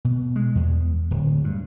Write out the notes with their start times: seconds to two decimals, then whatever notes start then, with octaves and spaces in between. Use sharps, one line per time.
0.05 B2
0.36 G#3
0.55 E2
1.11 D1
1.44 G2